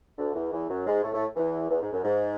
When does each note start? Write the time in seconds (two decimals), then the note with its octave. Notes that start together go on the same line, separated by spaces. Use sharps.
0.17 D2 D3
0.34 E2 E3
0.52 E2 E3
0.68 F#2 F#3
0.85 G#2 G#3
1.02 A2 A3
1.13 A2 A3
1.36 E2 E3
1.69 E2 E3
1.81 G#2
1.92 F#2
2.03 G#2